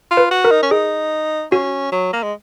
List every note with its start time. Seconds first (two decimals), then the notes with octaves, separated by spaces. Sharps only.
0.11 F4
0.17 B4
0.31 F#4
0.45 A#4
0.51 D#4
0.63 C#4
0.71 D#4 G#4
1.52 C#4 F#4
1.92 F#3
2.13 A#3
2.23 G#3